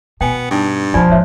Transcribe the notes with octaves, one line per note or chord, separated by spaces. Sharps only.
B2 B3 G5 G#5
G2 D#4 C#6 D#6
B1 C3 F3 F4 D5 G#5
G#1 D4 C5 C#5 E5